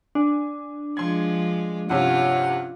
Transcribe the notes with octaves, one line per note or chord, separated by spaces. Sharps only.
D4 G#5
F3 G#3 C6 G#6
G2 C3 C#4 F4 F#5